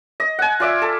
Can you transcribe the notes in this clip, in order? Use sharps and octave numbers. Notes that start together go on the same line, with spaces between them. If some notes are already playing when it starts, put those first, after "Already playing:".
D#5
F#5 G#5
F4 D5 E5
A4